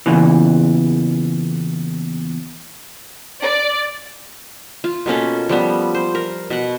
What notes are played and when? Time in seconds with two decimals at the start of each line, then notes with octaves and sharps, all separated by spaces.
0.06 E2 A#2 C#3 E3
3.42 D5
4.84 F4
5.06 B2 A#3 C#4 A4
5.49 F3 G3 B3
5.94 C5
6.15 A#4
6.50 B2 F#5